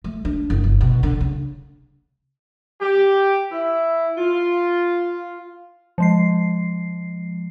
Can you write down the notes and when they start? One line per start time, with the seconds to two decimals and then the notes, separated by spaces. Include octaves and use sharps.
0.04 A3
0.25 D4
0.50 F#1
0.64 G1
0.81 B2
1.03 D3
1.21 C#3
2.80 G4
3.51 E4
4.17 F4
5.98 F3 G#3 C7